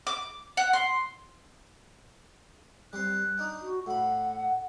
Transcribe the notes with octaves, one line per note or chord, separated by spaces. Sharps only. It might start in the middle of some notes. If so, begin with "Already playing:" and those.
D6
F#5
C6
G3 C4 C6 F#6
D4 D#4 G5
F#4
A2 F#5 B5